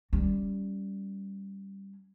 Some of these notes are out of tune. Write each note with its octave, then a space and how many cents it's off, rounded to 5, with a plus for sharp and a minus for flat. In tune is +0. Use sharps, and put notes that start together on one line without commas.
G3 +0 C#4 +0